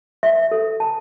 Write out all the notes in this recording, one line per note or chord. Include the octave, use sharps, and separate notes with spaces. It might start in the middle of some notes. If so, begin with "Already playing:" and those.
E5
A4
A5